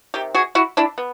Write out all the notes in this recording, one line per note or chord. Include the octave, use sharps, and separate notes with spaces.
C3 D#3 G4
F#4 G#4
E4 F#4
D4 E4
B3